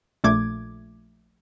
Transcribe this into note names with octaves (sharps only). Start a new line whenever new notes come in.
A#1 A#2 A3 D6 G#6